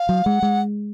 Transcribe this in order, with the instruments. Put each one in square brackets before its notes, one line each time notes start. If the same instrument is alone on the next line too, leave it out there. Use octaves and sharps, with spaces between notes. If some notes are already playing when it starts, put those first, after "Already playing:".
Already playing: [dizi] F5
[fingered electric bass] F#3
[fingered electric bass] G#3 [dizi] F#5
[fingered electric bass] G#3